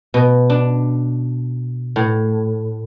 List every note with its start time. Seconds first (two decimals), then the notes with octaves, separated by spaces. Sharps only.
0.14 B2
0.50 D4
1.96 A2